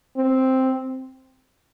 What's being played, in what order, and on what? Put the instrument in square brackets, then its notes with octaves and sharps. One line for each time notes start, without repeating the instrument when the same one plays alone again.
[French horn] C4